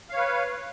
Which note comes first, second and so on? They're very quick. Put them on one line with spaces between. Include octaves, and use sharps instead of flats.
F5 C#5 B4